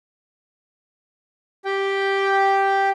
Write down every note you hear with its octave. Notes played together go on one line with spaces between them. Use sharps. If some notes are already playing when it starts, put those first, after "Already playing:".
G4 G5